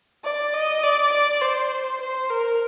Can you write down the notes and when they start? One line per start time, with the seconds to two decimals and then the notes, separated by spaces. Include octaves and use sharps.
0.25 D5
0.54 D#5
0.83 D5
1.13 D5
1.42 C5
2.01 C5
2.30 A#4